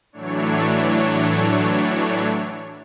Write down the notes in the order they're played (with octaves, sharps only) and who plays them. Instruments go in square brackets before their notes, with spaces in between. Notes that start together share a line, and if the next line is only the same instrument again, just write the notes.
[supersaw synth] A2 E3 F#3 A3 D4 C#5